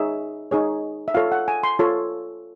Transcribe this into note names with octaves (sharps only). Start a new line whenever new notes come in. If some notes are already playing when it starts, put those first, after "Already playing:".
Already playing: D#4 G#4 C#5 E5
D#4 G#4 C#5
E5
F4 A4 C#5 F5
F#5
G#5
C6
F4 A4 C#5